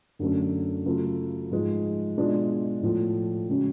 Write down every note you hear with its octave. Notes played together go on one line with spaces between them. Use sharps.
F#2 D3 F#3 A3 C#4
C#3 F#3 A3 F4
G#2 F3 G#3
B2 G#3 D4 F4
A2 F3 A3
C#3 G#3 C#4 F#4